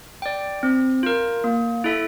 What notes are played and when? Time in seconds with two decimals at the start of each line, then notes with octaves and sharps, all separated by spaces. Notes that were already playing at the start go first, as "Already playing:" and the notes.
0.22 D5 G5
0.63 C4
1.03 F4 A#4
1.44 A#3
1.84 E4 A4 E5